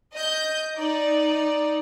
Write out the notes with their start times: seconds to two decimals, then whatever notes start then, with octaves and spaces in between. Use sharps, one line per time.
0.14 D#5 G6
0.77 D#4 D5